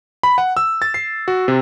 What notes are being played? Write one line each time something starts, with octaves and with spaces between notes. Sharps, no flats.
B5
F#5
E6
A6
C7
F#4
C3